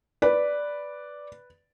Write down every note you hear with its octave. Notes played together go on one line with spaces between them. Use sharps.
B4 D5